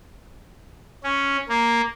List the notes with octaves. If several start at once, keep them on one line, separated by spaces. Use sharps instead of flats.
C#4
A#3